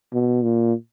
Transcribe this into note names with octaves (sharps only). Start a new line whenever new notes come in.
B2
A#2